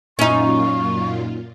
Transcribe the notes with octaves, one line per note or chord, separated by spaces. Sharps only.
F#2 A#2 C#4 D#4 F4 C#6